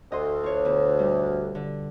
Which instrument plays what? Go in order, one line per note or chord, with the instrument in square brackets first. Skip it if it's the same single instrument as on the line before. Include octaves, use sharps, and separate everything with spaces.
[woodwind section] D2 [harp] D#5 C6
[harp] F4 C#5
B2 D3
G3
D3